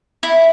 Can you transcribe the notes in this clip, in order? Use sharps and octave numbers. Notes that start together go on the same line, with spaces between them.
E4